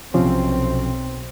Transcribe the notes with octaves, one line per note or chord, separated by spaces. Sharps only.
B1 C3 F3 C4 C#4